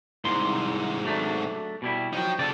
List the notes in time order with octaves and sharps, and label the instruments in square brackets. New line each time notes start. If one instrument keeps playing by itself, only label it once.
[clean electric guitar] C2 D#3 C6 [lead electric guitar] G#2 C3
[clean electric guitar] F#3 A3 D4
B2 G3 E4
[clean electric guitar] F3 F#3 [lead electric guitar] D#4 G5
[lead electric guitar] C#3 A4 [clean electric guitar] D5